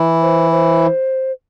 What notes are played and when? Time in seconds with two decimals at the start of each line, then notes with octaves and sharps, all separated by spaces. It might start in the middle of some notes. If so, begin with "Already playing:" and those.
Already playing: E3 E4
0.22 C5
0.51 C5